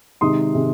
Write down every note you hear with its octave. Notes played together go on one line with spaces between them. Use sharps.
C3 D#3 G#3 D#4 C6 D#6
C3 D#3 G#3 D#4